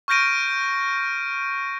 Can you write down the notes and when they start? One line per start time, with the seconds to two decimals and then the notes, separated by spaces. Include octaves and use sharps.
0.08 C#6 F6 G6 A#6 D7 D#7